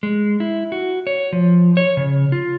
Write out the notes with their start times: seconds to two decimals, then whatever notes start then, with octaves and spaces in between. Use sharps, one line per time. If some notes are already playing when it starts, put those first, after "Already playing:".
0.03 G#3
0.40 E4
0.72 F#4
1.07 C#5
1.33 F3
1.77 C#5
1.97 C#3
2.32 F4